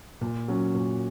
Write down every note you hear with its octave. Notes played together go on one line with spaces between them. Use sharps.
A#2
F#3 C#4
A#2